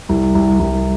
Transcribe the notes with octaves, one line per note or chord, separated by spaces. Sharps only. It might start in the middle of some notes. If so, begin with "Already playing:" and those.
C2
C2
C2